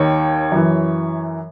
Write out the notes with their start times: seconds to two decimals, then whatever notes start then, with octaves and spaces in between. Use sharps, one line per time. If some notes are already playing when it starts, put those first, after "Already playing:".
Already playing: D#2 D#3 C#5
0.52 F#2 E3